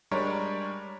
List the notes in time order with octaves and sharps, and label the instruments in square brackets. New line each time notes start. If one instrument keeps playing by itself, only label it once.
[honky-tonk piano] G3 G#3 D4 A#4 C#5